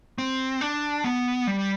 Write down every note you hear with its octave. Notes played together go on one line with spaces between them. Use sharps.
C4
D4
B3
G3